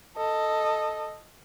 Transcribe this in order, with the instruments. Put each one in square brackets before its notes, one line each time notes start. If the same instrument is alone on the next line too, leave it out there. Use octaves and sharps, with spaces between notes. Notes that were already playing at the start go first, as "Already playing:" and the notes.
[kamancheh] A4 D#5